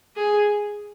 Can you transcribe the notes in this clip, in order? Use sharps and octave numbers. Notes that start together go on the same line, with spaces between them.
G#4